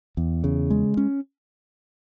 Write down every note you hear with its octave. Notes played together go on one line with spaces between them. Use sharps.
E2
C#3
G#3
C#4